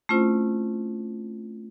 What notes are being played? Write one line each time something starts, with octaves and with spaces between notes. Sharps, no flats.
A3 C4 C#4 E4 F4 C5